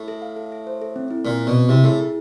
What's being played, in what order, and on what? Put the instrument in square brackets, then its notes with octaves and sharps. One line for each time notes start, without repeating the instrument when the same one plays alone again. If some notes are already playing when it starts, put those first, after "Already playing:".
Already playing: [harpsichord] A2
[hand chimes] A4
F5
A4
A4
C5
A4
C4
E4
[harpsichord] A#2 [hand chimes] C4
[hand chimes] C4
[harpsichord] B2
[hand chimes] C4
[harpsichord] C3 [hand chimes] E4
[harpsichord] A2 [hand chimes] G#4
[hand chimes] E4